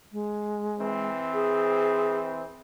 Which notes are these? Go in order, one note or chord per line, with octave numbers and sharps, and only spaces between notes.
G#3
E3 C4
G#4